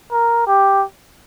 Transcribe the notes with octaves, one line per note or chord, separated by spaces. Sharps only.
A#4
G4